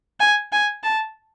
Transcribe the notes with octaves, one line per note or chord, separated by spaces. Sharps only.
G#5
G#5
A5